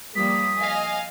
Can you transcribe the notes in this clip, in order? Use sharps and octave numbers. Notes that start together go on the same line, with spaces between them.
F3 G3 A#3 D#6 B6
D#5 F5 G#5